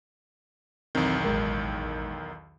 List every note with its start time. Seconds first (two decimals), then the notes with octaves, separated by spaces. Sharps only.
0.95 B1 E2 D#3 C4
1.24 A1 G#3 A#4